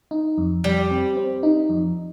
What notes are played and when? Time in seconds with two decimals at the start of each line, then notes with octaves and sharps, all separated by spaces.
0.11 D#4
0.38 F2
0.64 F2 G3
0.91 C4
1.17 C4
1.43 D#4
1.69 F2